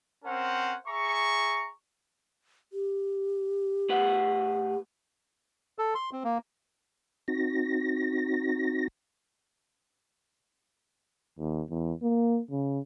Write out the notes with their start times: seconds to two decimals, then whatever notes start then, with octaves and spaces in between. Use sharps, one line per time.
0.25 C4 C#4 A#4 C5 F#5
0.87 G#4 E5 A#5 C#6
2.73 G4
3.89 A2 B4 F#5
5.79 A4
5.95 C6
6.12 C4
6.24 A#3
7.28 C4 D#4 F#4 A#6
11.38 D#2
11.70 E2
12.02 A#3
12.51 C#3